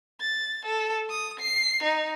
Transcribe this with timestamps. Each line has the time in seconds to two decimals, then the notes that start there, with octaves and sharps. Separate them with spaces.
0.21 A6
0.66 A4
1.10 D#6
1.40 C7
1.83 D#4